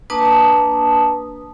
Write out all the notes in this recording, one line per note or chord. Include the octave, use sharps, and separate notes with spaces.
A#3 D4 B4 A5 D#6